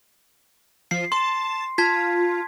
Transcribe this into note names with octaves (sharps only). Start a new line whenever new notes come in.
F3 C7
A5 C6
F4 A5 G#6 B6